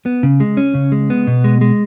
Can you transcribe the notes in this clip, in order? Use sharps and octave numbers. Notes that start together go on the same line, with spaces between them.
B3
C#3
G#3
C#4
C#3
G#3
B3
B2
G#3
G#3